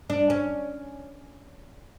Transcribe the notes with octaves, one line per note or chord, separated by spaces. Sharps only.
D4
C#4